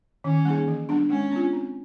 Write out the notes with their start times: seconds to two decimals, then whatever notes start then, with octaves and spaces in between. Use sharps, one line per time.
0.24 D#3 C#4
0.45 G3 A#3 D#4 G#4
0.68 E3
0.89 G3 B3 D4
1.10 G#3 C#4
1.31 B3 D4 F4
1.53 C4